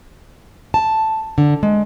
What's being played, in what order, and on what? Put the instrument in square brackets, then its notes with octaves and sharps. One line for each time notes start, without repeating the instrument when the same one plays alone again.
[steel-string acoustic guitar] A5
D3
G#3